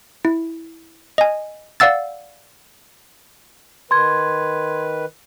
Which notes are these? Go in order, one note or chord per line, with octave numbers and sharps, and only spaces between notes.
E4
D#5 G#5
D5 F5 F#5 E6 A6
D#3 B4 C6 G#6